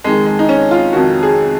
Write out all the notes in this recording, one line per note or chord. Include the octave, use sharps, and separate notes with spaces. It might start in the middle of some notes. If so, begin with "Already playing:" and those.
F2 D#3 G#3
G#3
D#4
C#4
F4
F2 D#3 F#4
G#4